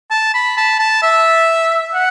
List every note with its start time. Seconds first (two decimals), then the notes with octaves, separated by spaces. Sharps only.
0.11 A5
0.34 B5
0.57 A5
0.79 A5
1.03 E5
1.95 F#5